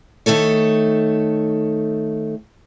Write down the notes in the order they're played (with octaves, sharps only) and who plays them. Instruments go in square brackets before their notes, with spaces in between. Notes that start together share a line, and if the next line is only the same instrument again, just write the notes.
[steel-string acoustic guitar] D#3 A3 A4 C#5